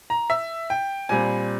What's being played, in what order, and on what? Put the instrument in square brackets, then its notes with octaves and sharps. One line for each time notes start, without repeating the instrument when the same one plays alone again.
[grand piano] A#5
E5
G5
A#2 G3 C4 G#5